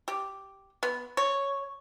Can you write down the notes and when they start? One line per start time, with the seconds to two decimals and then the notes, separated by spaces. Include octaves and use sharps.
0.08 G4
0.83 B3
1.17 C#5